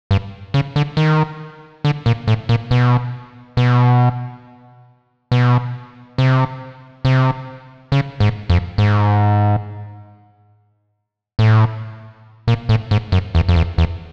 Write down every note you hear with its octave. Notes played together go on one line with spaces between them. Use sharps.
G2
C#3
D3
D#3
D3
A#2
A2
A#2
B2
B2
B2
C3
C3
C#3
G#2
F2
G#2
A2
A#2
A2
G#2
F#2
E2
F2
E2
E2